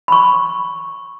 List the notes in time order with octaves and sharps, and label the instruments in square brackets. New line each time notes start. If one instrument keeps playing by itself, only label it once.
[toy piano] B5 C#6